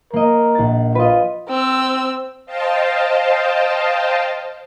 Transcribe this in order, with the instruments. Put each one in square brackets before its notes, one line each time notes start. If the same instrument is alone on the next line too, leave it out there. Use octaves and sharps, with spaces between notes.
[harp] A#3 D#5 [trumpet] A#4
[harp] A#1 A6
[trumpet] F4 [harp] B4 D#5
[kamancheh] C4 E6
[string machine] C5 D#5 F5 G5 A5